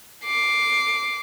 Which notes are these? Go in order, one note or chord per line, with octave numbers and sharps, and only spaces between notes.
D6 C7